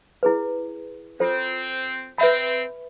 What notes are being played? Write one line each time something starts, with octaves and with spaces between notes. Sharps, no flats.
E4 G#4 B4
C4 F4 A4 C5
C4 B4 E5 B5